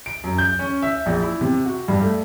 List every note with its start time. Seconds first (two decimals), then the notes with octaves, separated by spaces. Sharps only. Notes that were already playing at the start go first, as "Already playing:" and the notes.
0.06 D7
0.24 F#2
0.38 G6
0.59 C#4
0.82 E5
1.06 A#1
1.22 E4
1.41 C3
1.66 F#4
1.88 G2
2.02 A3